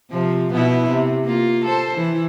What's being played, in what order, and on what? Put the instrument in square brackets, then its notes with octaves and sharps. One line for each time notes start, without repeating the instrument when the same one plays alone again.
[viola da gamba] C3 F3
B2 B3 E4
C3
A#3 F4
A4 C5
E3 E4